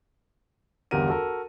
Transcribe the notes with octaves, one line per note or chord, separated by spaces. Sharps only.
G1 E2 G4 A#4 F#5 D#7
F#4 A4 A#4